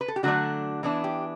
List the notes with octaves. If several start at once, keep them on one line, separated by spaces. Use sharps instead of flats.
B4
A4
G4
D3 F#3 A3 D4 F#4
E3 B3 D4 E4
G4